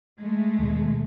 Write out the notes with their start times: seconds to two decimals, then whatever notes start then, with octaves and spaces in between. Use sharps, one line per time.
0.18 G#3 A3
0.59 D#2 B2